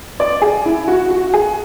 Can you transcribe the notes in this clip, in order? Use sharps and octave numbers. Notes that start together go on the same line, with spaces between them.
D5
G#4
E4
F#4
F#4
G#4